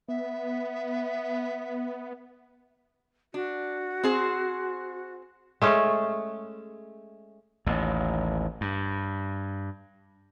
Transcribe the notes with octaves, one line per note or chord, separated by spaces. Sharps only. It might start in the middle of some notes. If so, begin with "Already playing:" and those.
B3 E5
D4 F#4
C4 G#4 C5
G#3 A3 C#4
A1 D#2
G2